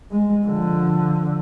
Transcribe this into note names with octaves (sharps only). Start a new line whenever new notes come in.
G#3
D3 F3